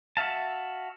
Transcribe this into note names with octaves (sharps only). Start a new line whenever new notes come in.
F#4 E5 F5 A5